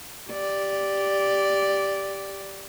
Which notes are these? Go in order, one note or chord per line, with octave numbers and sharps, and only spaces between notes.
G4 D5